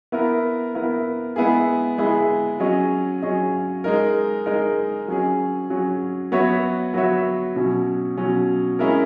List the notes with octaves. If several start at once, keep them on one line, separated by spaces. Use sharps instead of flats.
B3 E4 A#4
B3 E4 A#4
G#3 B3 E4 G#4
G#3 B3 E4 G#4
F#3 C#4 G#4 D#5
F#3 C#4 G#4 D#5
G#3 D#4 A#4
G#3 D#4 A#4
F#3 C#4 G#4
F#3 C#4 G#4
F#3 B3 F#4 C#5 E5
F#3 B3 F#4 C#5 E5
B2 F#3 C#4
B2 F#3 C#4
G#3 C#4 E4 A#4